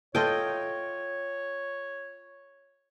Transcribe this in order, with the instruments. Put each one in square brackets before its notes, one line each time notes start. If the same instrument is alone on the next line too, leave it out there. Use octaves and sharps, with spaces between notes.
[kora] F4 A4 E5 [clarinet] C#5 [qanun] D#5 G5